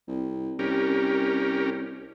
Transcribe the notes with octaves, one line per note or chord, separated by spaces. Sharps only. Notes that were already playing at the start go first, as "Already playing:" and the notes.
C2
C2 C#4 G4 A#4